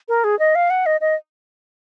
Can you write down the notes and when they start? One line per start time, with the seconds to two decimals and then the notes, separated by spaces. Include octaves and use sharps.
0.08 A#4
0.24 G#4
0.39 D#5
0.55 F5
0.70 F#5
0.86 D#5
1.01 D#5